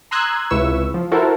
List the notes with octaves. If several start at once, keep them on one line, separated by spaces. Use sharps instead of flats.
A#5 C6 D#6 E6 F#6 G#6
C#2 C3 E4 B4 C#6 E6
F3
E4 F#4 A4 A#4 C5